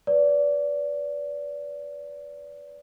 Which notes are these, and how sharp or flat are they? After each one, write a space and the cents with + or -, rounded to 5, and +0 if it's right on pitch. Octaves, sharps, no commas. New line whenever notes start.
B4 +0 D5 -25